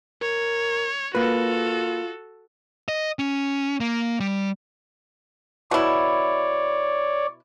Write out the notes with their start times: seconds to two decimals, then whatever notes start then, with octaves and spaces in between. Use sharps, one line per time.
0.22 A#4 C#5
1.15 A#3 F4 F#4 A4 B4
2.88 D#5
3.19 C#4
3.80 A#3
4.20 G3
5.71 B2 E4 C#5 D5